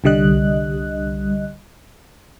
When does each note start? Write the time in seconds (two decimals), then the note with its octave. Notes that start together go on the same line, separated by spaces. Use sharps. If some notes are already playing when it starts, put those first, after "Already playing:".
0.04 C2 D3 G3 D#5 F#6